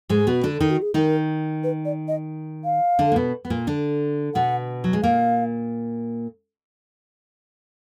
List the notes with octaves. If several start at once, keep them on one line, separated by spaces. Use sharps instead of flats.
G#2 G#3
G#4
B2 B3 F#4
D3 D4
D#3 D#4
F#4
G#4
D#3 D#4 A#4
B4
D5
D#5
F5
D3 D4
A#3
B2 B3
B3
A#2 A#3
D3 D4
B2 B3 F#5
F#3
G#3
A#2 A#3 F5